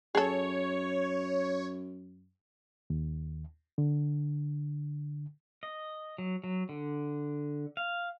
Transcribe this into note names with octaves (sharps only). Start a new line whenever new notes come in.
F#2 G#4 A4 C#5
D#2
D3
D#5
F#3
F#3
D3
F5